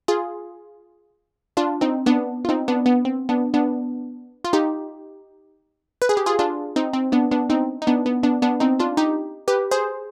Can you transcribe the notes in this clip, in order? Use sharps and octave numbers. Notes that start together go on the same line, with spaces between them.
F4 G#4
D4 F4
C4 D#4
B3 D4
F4
C4 D#4
B3 D4
B3
C4
B3 D4
B3 D4
F4
D#4 G4
B4
G#4
G4
F4 G#4
D4 F4
C4 D#4
C4
B3 D4
B3 D4
C4 D#4
D#4
B3 D4
B3
B3 D4
B3 D4
C4 D#4
D4 F4
D#4 G4
G4 B4
G#4 C5